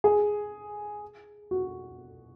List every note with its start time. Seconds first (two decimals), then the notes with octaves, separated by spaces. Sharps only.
0.04 G#4
1.51 F#4